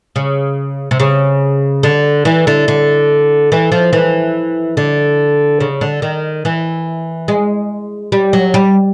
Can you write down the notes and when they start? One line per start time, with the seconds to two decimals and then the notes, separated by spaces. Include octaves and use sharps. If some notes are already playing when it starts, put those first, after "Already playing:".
0.16 C#3
0.91 C3
1.00 C#3
1.83 D3
2.25 E3
2.47 D3
2.68 D3
3.52 E3
3.72 F3
3.93 E3
4.77 D3
5.60 C#3
5.81 D3
6.02 D#3
6.45 E3
7.28 G#3
8.12 G3
8.33 F#3
8.54 G3